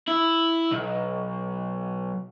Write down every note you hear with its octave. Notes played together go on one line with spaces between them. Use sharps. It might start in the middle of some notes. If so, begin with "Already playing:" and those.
E4
B1